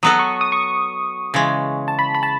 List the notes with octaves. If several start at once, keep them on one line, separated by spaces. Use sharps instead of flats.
F#3 B3 F#4 A4 D#6
C#6
D#6
C#6
C#3 E3 G#3
A5
B5
B5
A5